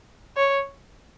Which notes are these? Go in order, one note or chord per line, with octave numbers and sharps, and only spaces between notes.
C#5